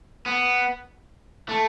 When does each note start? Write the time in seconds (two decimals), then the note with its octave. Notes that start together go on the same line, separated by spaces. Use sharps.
0.26 B3
1.49 A3